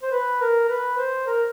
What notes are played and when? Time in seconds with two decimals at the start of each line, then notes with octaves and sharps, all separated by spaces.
0.03 C5
0.12 B4
0.41 A#4
0.69 B4
0.98 C5
1.27 A#4